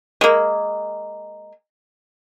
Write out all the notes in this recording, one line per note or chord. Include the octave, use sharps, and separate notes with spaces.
G#3 A#3